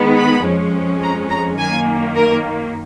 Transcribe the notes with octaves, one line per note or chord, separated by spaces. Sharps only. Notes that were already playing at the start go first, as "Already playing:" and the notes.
Already playing: D#3 G#3 B3
B5
F2 F3 G#3 C#4
A#5
A#5
F#2 D#3 A#3 G#5
A#4